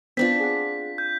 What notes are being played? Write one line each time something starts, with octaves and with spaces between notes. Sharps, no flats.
B3 C4 D4 F4 B6
G#4 F#5
G6